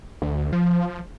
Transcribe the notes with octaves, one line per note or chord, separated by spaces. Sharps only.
D2
F3